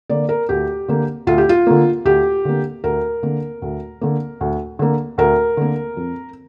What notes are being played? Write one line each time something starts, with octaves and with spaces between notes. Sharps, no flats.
D3 A#3 D5
A#4
D2 G4
D3 A#3
D2 F4
G4
F4
D3 A#3
D2 G4
D3 A#3
D2 A#4
D3 A#3
D2
D3 A#3
D2
D3 A#3
D2 A#4
D3 A#3
F2